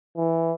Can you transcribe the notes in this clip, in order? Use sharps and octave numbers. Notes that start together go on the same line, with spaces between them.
E3